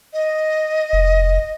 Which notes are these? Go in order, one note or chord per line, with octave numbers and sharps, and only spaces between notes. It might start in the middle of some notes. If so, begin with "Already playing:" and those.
D#5
F1